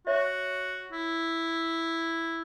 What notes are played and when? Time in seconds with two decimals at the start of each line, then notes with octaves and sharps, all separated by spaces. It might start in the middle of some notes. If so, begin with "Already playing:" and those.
0.07 F#4 C#5 E5
0.92 E4